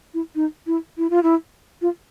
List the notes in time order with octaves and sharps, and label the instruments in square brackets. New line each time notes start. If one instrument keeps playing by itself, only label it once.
[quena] E4
D#4
E4
E4
F4
E4
F4